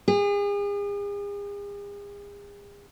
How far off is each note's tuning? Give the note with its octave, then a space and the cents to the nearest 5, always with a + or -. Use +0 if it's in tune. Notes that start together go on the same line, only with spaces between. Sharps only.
G#4 -40